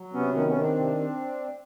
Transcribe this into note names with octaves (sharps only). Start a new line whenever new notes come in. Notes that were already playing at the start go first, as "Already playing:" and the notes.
Already playing: F#3
C3 B3 C#4
D#3 B3 C#4
B3 C#4
D#3
C4 D4
C3